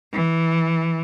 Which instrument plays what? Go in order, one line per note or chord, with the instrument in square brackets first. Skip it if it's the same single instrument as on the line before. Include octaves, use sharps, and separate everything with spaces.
[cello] E3